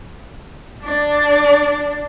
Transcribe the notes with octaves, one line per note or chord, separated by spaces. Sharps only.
D4 D5